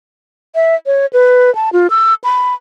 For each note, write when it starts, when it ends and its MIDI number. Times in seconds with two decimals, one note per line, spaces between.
0.55 0.75 76
0.86 1.06 73
1.13 1.54 71
1.55 1.69 81
1.73 1.87 65
1.90 2.14 88
2.24 2.54 83